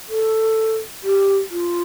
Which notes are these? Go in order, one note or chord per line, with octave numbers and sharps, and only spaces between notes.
A4
G4
F4